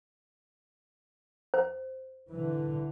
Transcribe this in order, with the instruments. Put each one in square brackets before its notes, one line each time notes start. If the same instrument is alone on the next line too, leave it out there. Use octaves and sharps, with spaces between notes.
[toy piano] C5
[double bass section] D3 E3